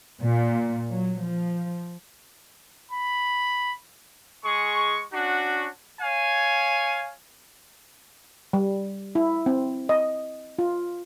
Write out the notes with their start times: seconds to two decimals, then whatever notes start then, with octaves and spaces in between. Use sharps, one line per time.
0.21 A#2
0.90 F#3
1.24 F3
2.92 B5
4.45 G#3 G#4 C#6
5.13 C#4 D4 F#4
6.01 C#5 F5 G#5
8.53 G3
9.15 E4
9.46 C4
9.89 D#5
10.59 F4